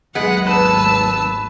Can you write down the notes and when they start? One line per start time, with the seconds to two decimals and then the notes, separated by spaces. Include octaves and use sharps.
0.15 G#1 D#2 F#3 G#3 B3 F#5
0.47 B4 A5 E6